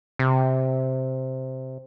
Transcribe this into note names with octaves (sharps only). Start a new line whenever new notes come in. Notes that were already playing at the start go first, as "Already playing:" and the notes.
C3